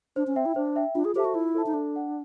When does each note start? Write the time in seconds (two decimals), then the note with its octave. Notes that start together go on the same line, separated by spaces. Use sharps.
0.16 D4 C5
0.27 C#4
0.36 C4 E5 G5
0.46 E4
0.56 D4 C5
0.76 E5 G5
0.95 D4 F4
1.05 G#4
1.15 G4 A4 C5 E5 A5
1.25 F#4
1.35 E4 F4
1.55 A4 C5 E5 A5
1.66 D#4
1.74 D4 A4
1.94 D5 F#5